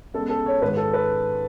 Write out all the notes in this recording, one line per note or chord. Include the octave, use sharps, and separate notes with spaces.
E2 C#3 G#3 A4
A4
C#5
G#2 D#3 G#3 B4
A4
B4